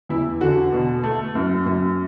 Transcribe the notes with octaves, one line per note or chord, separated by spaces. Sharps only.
E2 E4
D3 F#4
B2
A3
F#2
F#2